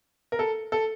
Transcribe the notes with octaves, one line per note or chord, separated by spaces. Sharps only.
A#4
A4
A4